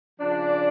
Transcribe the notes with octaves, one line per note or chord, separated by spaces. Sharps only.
C#3 F3 D4